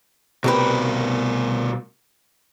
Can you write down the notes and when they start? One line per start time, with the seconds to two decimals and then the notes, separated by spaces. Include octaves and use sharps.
0.44 C2 B2 G4 A#4 B4